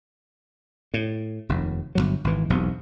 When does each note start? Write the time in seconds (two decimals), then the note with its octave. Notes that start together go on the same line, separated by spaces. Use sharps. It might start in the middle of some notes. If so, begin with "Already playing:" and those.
0.94 A2
1.49 F1 D#2
1.95 G1 C#2 F#3
2.24 G#1 E3
2.50 E1 B1 C3